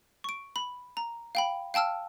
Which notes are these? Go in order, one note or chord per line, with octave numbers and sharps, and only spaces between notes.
C#6 D7
B5
A#5
F5 G5 B5
F5 G5 A5 E6 F6